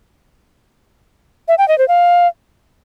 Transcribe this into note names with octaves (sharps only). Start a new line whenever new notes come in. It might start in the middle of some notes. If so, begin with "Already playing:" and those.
E5
G5
D#5
C5
F5